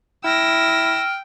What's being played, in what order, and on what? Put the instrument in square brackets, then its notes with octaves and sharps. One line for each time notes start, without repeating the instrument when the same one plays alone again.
[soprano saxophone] E4 [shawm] G5 [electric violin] E6 A#6 [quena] F6